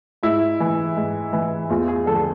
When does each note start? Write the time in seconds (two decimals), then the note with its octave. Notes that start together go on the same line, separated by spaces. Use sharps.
0.23 G#2 E4
0.60 E3
0.96 G#2
1.33 E3
1.70 E2 F4
1.88 G#4
2.06 D3 F3 A4